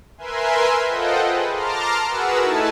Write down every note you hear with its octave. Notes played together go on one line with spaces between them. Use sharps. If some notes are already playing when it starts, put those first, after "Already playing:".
A#4 B4 E5 G#5 C6
F4 A4 C5 D#5 F#5 G5
G#4 B4
A5 A#5 C6 D6 F6
F#4 G#4 A#4 B4 F#5 E6
A3 D#4 E4 G#5 A5